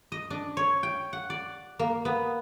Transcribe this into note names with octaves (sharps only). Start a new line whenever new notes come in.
D#5
D4
C#5
G5
F#5
D5
A#3
B3